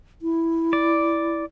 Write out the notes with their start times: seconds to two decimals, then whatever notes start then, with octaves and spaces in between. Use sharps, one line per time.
0.22 E4
0.73 D5